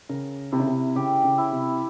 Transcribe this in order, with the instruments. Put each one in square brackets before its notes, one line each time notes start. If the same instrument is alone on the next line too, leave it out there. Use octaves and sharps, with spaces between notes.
[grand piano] C#3 [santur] A#4
[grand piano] C3 [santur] E4
[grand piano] C#3
C3
[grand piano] C#3 [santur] G4
[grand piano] C#3
[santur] E4
[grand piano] C3